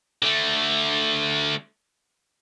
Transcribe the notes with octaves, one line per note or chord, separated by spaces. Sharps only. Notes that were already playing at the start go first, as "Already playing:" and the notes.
D3 A3